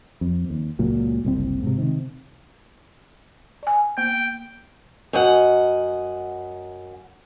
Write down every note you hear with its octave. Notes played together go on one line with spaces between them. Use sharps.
F2
D#2
C#2 A#2 F#3
F#1 C2 C4
G#2 C3
C3 D#3
D5 G#5
A#3 B3 G5
F#2 D#5 F#5